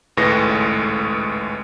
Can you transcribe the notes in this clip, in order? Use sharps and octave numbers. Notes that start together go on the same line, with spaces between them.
G#1 C#2 A2 G#3 B4 A#6